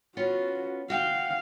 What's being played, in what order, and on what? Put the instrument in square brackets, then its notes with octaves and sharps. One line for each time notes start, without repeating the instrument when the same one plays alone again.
[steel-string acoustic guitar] B3 C#4 F4 [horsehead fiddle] F#4
[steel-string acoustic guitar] F#4 G5 [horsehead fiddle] F5